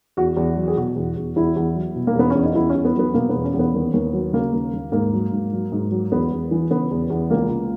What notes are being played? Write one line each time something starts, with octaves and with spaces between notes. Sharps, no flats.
E2 F#4
E2
F#3
G#4
B2 F#4
E2
E2
E2 E4
E2
F#3
B2
A#3
E2 B3
E2 C#4
D#4
E2 E4
C#4
E2
B3
F#3 B3
B2 A#3
B3
E2
C#4
E2
B3
D#2
D#2
F#3
C#3 A#3
D#2
D#2
G#2 A#3
F#3
G#2
F#3
G#2
F#3
E2 B3
E2
E3
C#3 B3
E2
E2
C#2 A#3
C#2